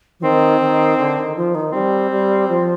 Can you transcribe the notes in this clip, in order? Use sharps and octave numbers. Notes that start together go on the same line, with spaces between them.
F3
D#3 C4
D#3
D3
D#3
F3
D#3
G3 C4
G3
F3